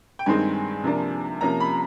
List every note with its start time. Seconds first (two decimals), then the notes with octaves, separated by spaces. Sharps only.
0.19 G5
0.26 G2 D#3 G#3 C4 D#4 G#5
0.84 C3 F3 A#3 D4
1.41 C3 F3 A#3 C#4 A#5
1.60 B5